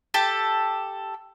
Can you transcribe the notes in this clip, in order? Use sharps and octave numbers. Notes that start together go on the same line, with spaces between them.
G4 A4 A5